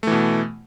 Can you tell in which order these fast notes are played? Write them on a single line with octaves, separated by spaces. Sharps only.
A3 E3 B2